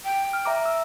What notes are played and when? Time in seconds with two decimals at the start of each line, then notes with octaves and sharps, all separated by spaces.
0.05 G5
0.33 F6
0.45 E5 A#5 D6
0.66 E6